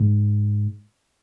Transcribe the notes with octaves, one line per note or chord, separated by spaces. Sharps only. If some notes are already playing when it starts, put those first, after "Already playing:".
Already playing: G#2